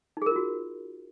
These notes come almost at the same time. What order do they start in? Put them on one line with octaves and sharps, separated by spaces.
D#4 G#4 A#4 F4 F#4